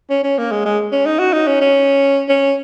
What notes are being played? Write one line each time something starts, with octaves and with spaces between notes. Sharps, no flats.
C#4
C#4
A#3
G#3
G#3
C#4
D#4
F#4
D#4
C#4
C#4
C#4